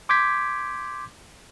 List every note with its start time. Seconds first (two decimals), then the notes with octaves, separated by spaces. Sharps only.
0.09 C6 D6 G6 G#6 B6